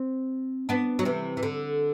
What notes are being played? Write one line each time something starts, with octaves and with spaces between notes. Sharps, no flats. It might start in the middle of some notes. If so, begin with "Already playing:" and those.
Already playing: C4
B3 D4
F#3
C3 E3
E3
D3